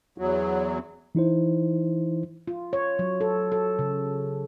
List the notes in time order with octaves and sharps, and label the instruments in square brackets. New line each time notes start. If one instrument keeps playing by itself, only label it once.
[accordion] E2 F#3
[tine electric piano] E3 D#4 E4 C5
[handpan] F4
C#5
F#3
A4
A4
C#3